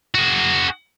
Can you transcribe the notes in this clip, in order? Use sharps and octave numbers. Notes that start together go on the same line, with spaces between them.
F#4 G#4